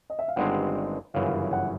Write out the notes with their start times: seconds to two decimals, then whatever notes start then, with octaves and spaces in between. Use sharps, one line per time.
0.10 D#5
0.19 E5
0.28 F5
0.36 G1 G2 D#3 G#3 C4 F#5
1.14 G1 F#2 C#3 E3 F5
1.53 F#5